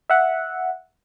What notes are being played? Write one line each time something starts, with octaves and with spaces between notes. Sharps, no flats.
E5 F#5